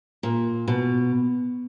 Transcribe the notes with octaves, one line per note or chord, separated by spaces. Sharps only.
A#2
B2